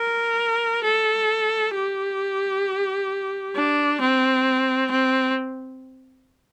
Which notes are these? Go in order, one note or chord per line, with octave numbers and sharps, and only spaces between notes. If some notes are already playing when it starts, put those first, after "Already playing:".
Already playing: A#4
A4
G4
D4
C4
C4